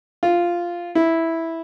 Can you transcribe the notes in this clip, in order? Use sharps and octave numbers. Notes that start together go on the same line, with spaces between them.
F4
E4